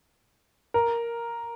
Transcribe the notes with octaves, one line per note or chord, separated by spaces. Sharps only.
A#4